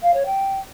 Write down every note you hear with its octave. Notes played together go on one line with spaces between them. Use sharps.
F5
C#5
G5